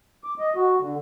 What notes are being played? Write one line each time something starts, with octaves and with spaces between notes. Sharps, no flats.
D6
D#5
F#4
D3